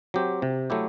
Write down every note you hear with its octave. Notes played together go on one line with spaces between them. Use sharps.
F#3 C4 G4
C3
F#3 A3 E4 G4